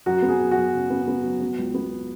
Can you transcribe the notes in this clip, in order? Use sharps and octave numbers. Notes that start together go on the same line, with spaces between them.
F#2 F#4
B3
G#4
F#2
F#4
F#2
C#3
B3
B3
F#3
B3
C#2
B3